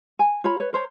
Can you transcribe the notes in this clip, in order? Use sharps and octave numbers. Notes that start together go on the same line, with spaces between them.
G#5
F4 C#5 A#5 B5
B4 C#5
A#4 C5 C#5 A#5